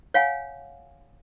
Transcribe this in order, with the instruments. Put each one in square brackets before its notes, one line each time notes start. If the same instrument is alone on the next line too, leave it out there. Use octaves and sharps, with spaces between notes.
[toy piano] C#5 F5 F#5 G#5